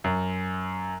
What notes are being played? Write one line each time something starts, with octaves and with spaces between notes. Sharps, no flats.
F#2